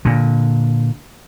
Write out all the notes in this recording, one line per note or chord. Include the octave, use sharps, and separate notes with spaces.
A#2 D3